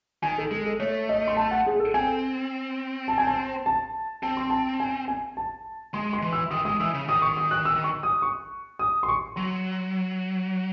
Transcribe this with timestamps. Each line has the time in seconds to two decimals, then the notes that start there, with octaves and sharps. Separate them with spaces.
0.23 D#3 G#5
0.38 A4
0.51 G#3 A4
0.66 A4
0.80 A3 C#5
1.09 D#5
1.28 C6
1.37 A5
1.51 F#5
1.66 G#4
1.80 A4
1.94 C4 G#5
3.08 A5
3.18 G#5
3.27 A5
3.66 A5
4.23 C4 A5
4.37 C6
4.50 A5
4.80 G#5
5.08 G#5
5.37 A5
5.94 G#3 C6
6.13 C6
6.22 E3
6.33 E6
6.51 D#3 D#6
6.65 G#3 D#6
6.80 E3 E6
6.94 C#3
7.08 D#3 D#6
7.22 C#6
7.37 D#6
7.51 F#6
7.65 E6
7.84 C#6
8.03 D#6
8.22 C#6
8.79 D#6
9.03 C6
9.08 C#6
9.36 F#3 C6